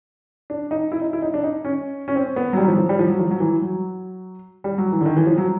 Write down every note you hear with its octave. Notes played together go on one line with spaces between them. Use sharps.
D4
D#4
E4
D#4
E4
D#4
D4
D#4
C#4
C#4
C4
B3
F#3
G3
F#3
F3
F3
G3
F3
F#3
F3
F#3
E3
F#3
G3
F#3
E3
D3
D#3
E3
F3
F#3